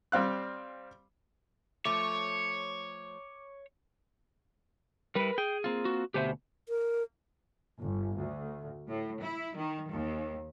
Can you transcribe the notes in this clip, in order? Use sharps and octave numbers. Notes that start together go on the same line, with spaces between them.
G3 C4 F5 F#6
F3 A3 C#5 D6
G3 E4 A#4 B4
G#4 G5
A#3 C4 F4
F#4
D2 B2 G4 C5 E5
A#4
G1
D2
A2
E4
D#3
D#2